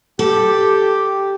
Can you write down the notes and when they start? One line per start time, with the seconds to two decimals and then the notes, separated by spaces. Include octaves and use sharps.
0.19 G4 A4